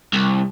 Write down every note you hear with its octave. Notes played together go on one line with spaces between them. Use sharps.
C2